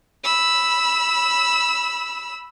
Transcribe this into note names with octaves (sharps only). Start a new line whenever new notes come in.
B5 E6